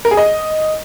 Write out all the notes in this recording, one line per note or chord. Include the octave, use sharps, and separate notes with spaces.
A#4
G#4
D#5